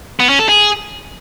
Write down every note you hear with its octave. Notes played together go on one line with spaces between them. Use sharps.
B3
C#4
A4
G#4